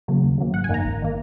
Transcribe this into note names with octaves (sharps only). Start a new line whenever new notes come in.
C#3 F#3 A#3
D#2
C#3 F#3 A#3
G#1 F#5
G#5
F#2 D#3 A#3 A#5
G#1
D#3 A#3